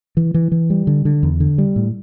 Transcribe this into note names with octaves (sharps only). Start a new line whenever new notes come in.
E3
E3
E3
G3
D3
D3
E2
D3
G3
A2